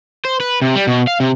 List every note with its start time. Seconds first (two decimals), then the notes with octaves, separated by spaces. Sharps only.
0.25 C5
0.40 B4
0.62 C3
0.75 G3
0.87 B2
1.07 F5
1.20 C3